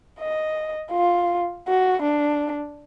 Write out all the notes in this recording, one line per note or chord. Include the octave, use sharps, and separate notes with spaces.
D#5
F4
F#4
D4